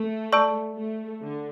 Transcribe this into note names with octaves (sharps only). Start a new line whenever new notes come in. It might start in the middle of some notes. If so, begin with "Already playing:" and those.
Already playing: A3
D5 A5 C#6 E6
A3
D3